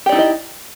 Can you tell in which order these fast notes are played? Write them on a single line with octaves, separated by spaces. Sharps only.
G4 D5 D#4 E4 D#5